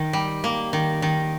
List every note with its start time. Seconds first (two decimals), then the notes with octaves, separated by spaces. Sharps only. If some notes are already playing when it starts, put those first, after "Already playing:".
Already playing: D#3
0.13 G3
0.44 A#3
0.73 D#3
1.02 D#3